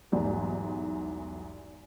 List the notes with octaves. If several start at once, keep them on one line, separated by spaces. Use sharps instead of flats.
B1 E2 G#2 G3